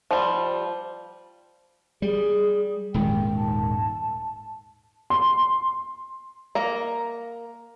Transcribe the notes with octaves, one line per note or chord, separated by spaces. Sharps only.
F3 G3
G3 G#4
D#1 G#2 D#3 G5
A5
C6
A#3 A#5